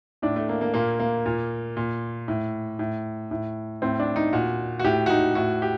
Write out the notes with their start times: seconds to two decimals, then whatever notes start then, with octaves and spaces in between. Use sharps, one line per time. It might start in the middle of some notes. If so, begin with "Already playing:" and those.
0.22 A2 D4
0.36 A3
0.49 A#3
0.61 A#3
0.74 A#2 A#3
1.00 A#3
1.26 A#2
1.77 A#2
2.28 A2
2.79 A2
3.31 A2
3.82 A2 C4
4.00 D4
4.16 D#4
4.33 A#2 F#4
4.79 F#4
4.84 A2 G4
5.06 F#4
5.10 D#4
5.35 A2 F#4
5.62 G4